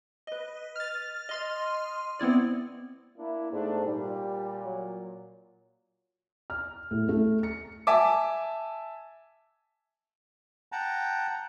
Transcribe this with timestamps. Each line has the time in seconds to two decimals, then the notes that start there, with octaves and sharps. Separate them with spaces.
0.27 B4 D#5
0.76 F6 A6
1.29 D#5 C6 F6
2.19 B3 C4 E4 D5
3.18 A#3 D4 E4
3.53 G#2 A3 B3 D4
3.86 A#2 G3
4.65 F#3
6.50 F6
6.91 A2
7.09 A3
7.43 C#7
7.87 E5 G#5 A5 D6
10.72 F#5 G5 A5 A#5